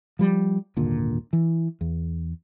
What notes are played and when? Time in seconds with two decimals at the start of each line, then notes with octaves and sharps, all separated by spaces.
0.19 F3 G3
0.77 D#1 G#1 A#2 D3
1.33 E3
1.81 E2